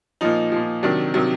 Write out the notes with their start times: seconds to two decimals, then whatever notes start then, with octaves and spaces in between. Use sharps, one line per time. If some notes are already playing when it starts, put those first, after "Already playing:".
0.21 A#2 F3 D#4
0.52 A#2 F3
0.83 C3 D#3 F#3 D4
1.14 C3 D#3 F#3